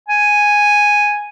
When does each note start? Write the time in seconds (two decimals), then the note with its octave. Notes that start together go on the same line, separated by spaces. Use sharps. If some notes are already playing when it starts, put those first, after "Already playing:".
0.08 G#5